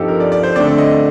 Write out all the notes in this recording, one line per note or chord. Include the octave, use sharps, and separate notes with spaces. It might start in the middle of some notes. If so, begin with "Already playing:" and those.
Already playing: G2 F3 C4 D#4 G4 A4
A#4
D5
D5
C5
D3 A3 C4 D5
D#5